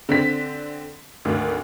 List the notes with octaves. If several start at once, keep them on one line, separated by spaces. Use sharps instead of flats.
D3 C4 B6
G#1 D2